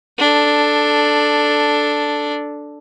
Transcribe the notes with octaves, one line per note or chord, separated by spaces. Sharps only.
D4 A4